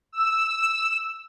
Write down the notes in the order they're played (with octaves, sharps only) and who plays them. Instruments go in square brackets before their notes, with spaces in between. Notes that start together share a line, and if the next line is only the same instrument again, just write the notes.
[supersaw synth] E6